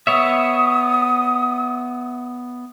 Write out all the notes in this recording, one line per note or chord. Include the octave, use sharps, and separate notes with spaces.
B3 C#5 E5 D#6